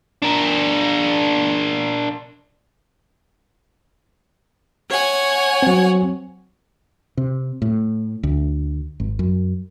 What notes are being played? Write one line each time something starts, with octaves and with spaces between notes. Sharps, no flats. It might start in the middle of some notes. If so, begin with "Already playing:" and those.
D4 A#4
C#5 F#5 G#5
F#3 C4
C3
A2
D2
G#1
F#2